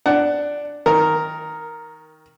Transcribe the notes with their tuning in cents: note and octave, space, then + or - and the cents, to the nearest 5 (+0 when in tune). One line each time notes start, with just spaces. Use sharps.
D4 +0 F#5 +15
D#3 +20 A#4 +0